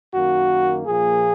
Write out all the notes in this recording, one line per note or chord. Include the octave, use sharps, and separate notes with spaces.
F#2 D#3 A#3 F#4
A#2 F3 A#3 G#4